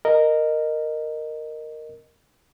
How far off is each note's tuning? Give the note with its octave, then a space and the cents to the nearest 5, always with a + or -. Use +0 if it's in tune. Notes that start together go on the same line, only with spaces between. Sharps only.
A#4 -5 D#5 -15